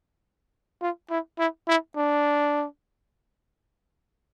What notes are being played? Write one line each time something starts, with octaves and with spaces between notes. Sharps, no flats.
F4
E4
E4
E4
D4